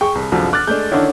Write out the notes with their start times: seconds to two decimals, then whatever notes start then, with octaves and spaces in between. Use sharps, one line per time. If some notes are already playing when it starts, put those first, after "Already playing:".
0.01 G#4 G5 C#6
0.15 C2
0.32 C2 F#2 D3 F3
0.53 D6 F6 F#6 A6
0.67 G#3 A3 D4 G6
0.92 D3 D#3 C#4 D4 E4 C#5